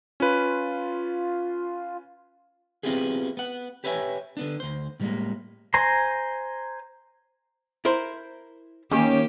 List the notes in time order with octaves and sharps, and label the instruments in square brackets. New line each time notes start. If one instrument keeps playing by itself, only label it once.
[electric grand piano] C#4 B4 [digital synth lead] F4
[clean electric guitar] B3 C4 E4 F4 G4 G#4
B3 F#5
G4 B4 C#5 E5 F#5 G#5
D3 B3 D4
D2 C5
A2 F3 G3 G#3 A#3
[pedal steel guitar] C5 G#5 A#5 C6
[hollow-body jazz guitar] E4 A#4 C5
[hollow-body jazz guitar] D#2 [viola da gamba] D#3 A#3 G4 [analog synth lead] C#4